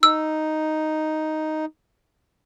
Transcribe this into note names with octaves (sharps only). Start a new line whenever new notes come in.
D#4 E6